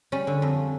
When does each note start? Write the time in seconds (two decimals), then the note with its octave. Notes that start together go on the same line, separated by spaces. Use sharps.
0.12 G3 C#4
0.27 D3
0.42 F2